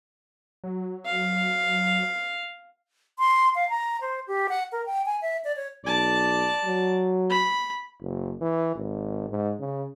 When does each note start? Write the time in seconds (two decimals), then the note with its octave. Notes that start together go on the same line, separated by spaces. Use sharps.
0.64 F#3
1.06 F5
3.19 C6
3.55 F5
3.70 A#5
4.01 C5
4.27 G4
4.49 F#5
4.72 A#4
4.86 G5
5.06 G#5
5.21 E5
5.44 D5
5.56 C#5
5.85 B1 D5 A5
6.65 F#3
7.30 B5
8.02 F#1
8.41 E3
8.75 G#1
9.30 G#2
9.60 C#3